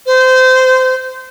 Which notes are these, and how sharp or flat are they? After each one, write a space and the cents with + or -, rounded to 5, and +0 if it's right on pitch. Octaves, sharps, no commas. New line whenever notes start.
C5 -25